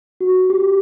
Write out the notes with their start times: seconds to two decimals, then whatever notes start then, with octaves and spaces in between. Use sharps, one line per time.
0.21 F#4
0.50 G4